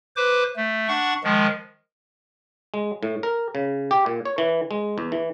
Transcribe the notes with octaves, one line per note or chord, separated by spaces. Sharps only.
B4 C5 D6
A3
D4 F#5 C#6
D#3 F3 G#3
G#3
A2
A#4
C#3
G4
A#2
C#5
E3
G#3
E2
E3